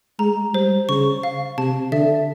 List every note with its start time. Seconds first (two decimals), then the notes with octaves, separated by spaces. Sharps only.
0.19 G#3 A#5
0.54 G3 C5
0.89 C#3 C#6
1.23 F5
1.58 C3 A5
1.92 D3 E5